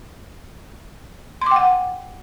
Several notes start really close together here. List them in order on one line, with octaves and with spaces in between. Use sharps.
C6 D6 G5 F#5